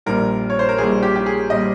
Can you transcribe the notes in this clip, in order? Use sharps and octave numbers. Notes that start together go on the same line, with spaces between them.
A#1 A#2 G3 A#4
C#5
C5
A#4
A#1 A#2 G3 G#4
G4
G4
G#4
A#2 G3 D#5